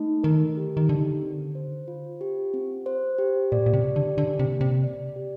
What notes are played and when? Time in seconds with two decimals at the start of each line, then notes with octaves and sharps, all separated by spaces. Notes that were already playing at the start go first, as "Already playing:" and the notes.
Already playing: A3 D#4
0.23 D#3 A#4
0.57 G4
0.77 D#3
0.89 D3 D#4
1.22 C4
1.55 C5
1.88 F4
2.21 G4
2.54 C4
2.86 C5
3.18 G4
3.52 A#2 D5
3.66 A#2
3.74 C3
3.84 G4
3.96 D3
4.17 D3 D4
4.39 C3
4.51 A#3
4.61 C3
4.84 D5
5.16 G4